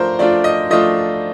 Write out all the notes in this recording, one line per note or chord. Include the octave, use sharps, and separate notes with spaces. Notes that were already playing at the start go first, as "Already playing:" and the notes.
Already playing: F3 A3 D4 F4 A#4 C5
F3 A3 D4 F4 D5
D#5
F3 A3 D4 F4 D#5